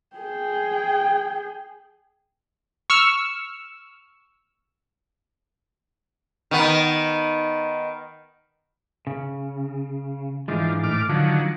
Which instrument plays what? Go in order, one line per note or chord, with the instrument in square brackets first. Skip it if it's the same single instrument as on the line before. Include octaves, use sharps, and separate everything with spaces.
[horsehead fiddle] G#4 G5
[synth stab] C#6 E6 F6
[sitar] D#3 B3
[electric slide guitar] C#3
[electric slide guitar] G#2 E3 G#3 [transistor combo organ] F3 D4
[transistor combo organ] A2 D6 F6
[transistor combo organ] D3 D#3 F#3 [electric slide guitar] F3